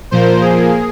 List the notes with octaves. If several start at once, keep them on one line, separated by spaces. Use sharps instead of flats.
A#2 F3 A#3 C5
G#4